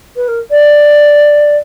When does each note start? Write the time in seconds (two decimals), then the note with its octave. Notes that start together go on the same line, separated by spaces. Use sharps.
0.16 B4
0.28 A#4
0.51 D5